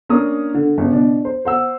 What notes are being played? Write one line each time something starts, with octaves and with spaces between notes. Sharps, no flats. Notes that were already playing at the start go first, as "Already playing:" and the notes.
A#3 C#4 D4 D#6
D3
G1 C#3
B2 D4
C5
C5 F#5 E6